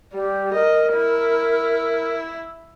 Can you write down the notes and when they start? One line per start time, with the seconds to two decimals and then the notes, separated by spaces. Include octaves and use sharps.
0.14 G3 G4
0.54 A#4 D#5
0.94 E4